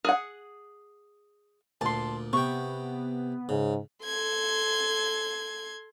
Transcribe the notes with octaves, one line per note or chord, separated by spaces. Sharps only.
G#4 F#5
D2 A#2 A5 C6
C3 B3 G5 C#6
G#2 C#3
A4 C6 G#6